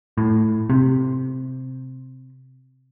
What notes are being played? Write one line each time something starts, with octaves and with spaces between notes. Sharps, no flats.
A2
C3